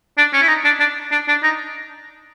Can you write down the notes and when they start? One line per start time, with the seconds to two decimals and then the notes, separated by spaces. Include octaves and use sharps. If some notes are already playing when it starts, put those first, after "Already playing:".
0.18 D4
0.33 C#4
0.42 E4
0.48 D#4
0.65 D4
0.80 D4
1.12 D4
1.28 D4
1.43 D#4